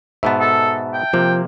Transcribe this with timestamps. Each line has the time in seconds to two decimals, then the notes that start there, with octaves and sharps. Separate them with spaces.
0.23 G#2 B2 B3 E5 A5
0.41 A4
0.94 G5
1.13 C3 F3 A#3